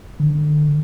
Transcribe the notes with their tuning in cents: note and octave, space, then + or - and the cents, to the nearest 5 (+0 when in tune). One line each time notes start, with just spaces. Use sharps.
D3 +35